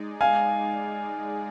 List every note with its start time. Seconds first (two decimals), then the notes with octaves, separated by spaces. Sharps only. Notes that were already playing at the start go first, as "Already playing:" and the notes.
Already playing: G#3 D#4 G#4 D5
0.21 F5 G#5